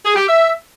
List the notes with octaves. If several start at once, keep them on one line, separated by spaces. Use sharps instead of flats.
G#4
G4
E5